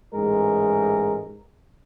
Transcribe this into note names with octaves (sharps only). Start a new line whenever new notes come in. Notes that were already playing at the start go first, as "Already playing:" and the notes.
A1 G#2 G#3 A#4